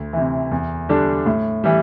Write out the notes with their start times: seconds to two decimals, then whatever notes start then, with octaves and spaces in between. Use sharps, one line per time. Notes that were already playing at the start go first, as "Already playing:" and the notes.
Already playing: D2
0.13 C3 E3
0.51 E2
0.89 D3 G3 D4
1.26 A2
1.64 E3 G3